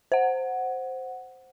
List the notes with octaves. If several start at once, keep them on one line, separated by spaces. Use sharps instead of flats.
C5 F#5